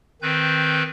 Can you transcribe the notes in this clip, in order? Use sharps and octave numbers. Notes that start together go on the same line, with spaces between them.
D#3 C4 B4 G6